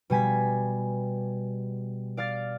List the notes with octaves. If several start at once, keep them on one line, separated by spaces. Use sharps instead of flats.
B2 G3 G#5 B6
D5 F5 D6 F6 A6